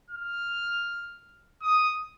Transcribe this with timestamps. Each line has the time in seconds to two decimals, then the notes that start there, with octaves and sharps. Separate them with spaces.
0.10 F6
1.62 D#6